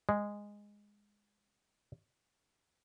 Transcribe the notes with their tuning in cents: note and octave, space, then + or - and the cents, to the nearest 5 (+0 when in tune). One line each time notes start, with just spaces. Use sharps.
G#3 -10